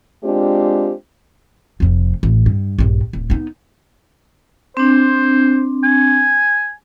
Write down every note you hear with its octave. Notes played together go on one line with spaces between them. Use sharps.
G#3 C4 D4 F4 G4
F1 F2
A1
G2
A#1 G2
D1
B3 D#4
C4 D4 C5
G#5